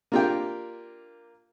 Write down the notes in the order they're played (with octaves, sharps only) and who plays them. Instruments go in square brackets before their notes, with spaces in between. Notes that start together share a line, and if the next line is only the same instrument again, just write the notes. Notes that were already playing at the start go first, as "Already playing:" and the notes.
[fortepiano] A#3 D4 F4 G4 A#4 G5